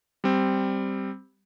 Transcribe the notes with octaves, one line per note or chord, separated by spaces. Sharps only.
G3 C4